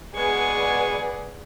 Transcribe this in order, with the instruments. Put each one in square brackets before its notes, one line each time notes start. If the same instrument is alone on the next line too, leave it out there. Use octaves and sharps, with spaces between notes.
[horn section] B2 G#3 G#5 [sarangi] G#4 [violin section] B4 D5 F#5 [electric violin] C#6